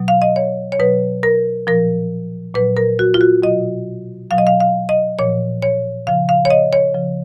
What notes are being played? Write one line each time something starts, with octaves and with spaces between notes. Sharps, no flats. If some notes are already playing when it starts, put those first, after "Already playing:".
Already playing: B2 F#3
F5
D#5
C#5
C#5
B2 F#3 B4
A#4
A#2 F3 A#4
A#2 F#3 B4
A#4
F#4
F4
F#4
B2 F#3 D#5
B2 F#3 F5
D#5
F5
F5
D#5
A#2 F3 C#5
C#5
C#3 F3 F5
F5
C#5
D#5
C#5
C#3 F3